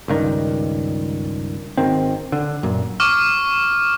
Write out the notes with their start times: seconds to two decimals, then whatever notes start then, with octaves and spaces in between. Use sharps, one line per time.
0.08 C#2 G2 D#3
1.77 G#1 D#3 C4
2.32 D3
2.63 F#2 A#2
3.00 C#6 D6 F6